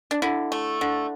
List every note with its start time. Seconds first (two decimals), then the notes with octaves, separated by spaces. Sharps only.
0.11 D4
0.22 D3 E4
0.52 A3
0.81 D3